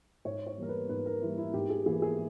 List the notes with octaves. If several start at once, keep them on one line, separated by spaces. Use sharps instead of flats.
G#2 C#5
C#5
E3 G3 A#3 A#4
B4
G#2 B4
A#4
E3 G3 A#3 E4
E4
G#2 G4
G#4
E3 A#3 G#4
G#4